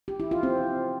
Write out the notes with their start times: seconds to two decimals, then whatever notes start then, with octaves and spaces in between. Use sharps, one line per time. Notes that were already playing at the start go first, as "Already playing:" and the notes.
0.08 G4
0.20 E4
0.31 F4
0.43 C4